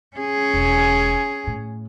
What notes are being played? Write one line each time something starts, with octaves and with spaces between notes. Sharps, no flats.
C#4 G#4
E1
A2